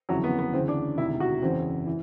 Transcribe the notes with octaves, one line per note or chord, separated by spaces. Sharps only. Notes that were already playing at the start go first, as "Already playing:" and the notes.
G1 F2 C#3 E3 F#3
B3
B3
D2 C#3 E3 C4
D4
E1 D2 C3 D#3 E4
F#4
F#1 E2 C#3 E3 C4
E3